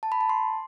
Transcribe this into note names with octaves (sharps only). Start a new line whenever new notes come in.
A5
B5
A5
C6